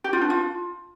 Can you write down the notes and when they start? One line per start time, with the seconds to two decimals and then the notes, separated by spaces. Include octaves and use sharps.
0.04 G4
0.13 F4
0.21 D4
0.30 F4